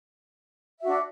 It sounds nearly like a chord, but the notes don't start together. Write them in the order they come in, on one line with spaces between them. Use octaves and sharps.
E5 F#4 D4